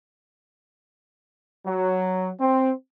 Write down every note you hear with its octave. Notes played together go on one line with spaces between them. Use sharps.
F#3
C4